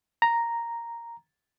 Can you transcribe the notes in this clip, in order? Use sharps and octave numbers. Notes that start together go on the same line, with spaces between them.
A#5